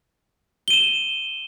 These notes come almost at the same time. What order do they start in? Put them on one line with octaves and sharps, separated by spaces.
G7 D#7 E7